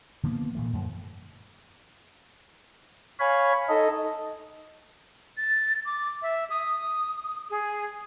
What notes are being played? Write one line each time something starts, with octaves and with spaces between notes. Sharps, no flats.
D3 F3 A#3 B3
A#2 E3 A3
F#2 A#2 D3 F3
C#5 F5 G#5 B5
D#4 A4 D#5
A6
D6
E5
D#6
G#4